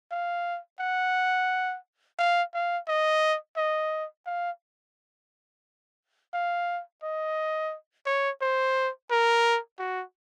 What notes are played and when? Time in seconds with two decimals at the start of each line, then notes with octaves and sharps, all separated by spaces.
0.11 F5
0.80 F#5
2.19 F5
2.54 F5
2.88 D#5
3.57 D#5
4.27 F5
6.34 F5
7.03 D#5
8.06 C#5
8.42 C5
9.11 A#4
9.79 F#4